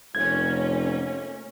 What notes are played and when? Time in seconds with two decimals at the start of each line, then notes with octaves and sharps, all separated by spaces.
0.15 F1 A3 A#3 C#4 G#6